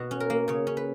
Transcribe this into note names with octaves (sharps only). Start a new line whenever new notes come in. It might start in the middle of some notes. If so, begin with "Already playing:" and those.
Already playing: B2 F#4
C#4
A#4
A#3
C#3 C#5
C#4
B4